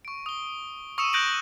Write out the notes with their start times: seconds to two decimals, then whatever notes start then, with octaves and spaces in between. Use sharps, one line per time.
0.05 C#6 D7
0.26 D#6 G7
0.98 C#6 D#6 E6 C#7 D#7 E7
1.13 D#6 F#6 G6 A#6 D7 F#7